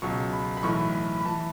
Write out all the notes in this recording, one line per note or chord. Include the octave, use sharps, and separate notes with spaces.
C#2 B2 F#3 C#6
B5
B5
B1 A2 E3 C#6
B5
B5
E3 A5